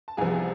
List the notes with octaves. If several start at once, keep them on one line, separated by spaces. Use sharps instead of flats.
A5
C2 C3 F3 B3 G#4 G#5